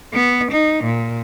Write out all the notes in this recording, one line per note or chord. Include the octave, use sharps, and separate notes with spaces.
B3
D#4
A#2